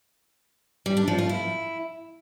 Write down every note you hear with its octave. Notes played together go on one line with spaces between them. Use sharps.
G3
D4
F3
F4
E4